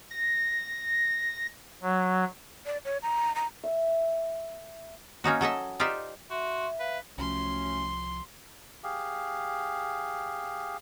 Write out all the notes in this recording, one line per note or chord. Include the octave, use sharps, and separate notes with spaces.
A#6
F#3
D5
C#5
A#5
A#5
E5
A#3 C#4 D#4 F#4
F#3 A4 D#5 E5
D#4 F4 G4 C5 D5 E5
F#4 E5 C6
B4 F5
C2 F3 F#3 A3 C#4 C6
G4 G#4 F5